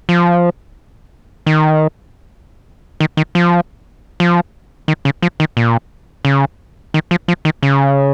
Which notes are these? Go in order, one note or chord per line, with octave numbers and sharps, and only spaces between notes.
F3
D#3
D#3
D#3
F3
F3
D#3
C#3
F3
D#3
A#2
C#3
D#3
F3
F3
D#3
C#3